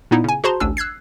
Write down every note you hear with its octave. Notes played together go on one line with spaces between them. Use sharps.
A#2 B3 D#4 E4
C#3 G#5
F#4 G#4 C5 A5 A#5 C6
A1 D2 D4 G#5 E6
E6 F#6 G#6 C7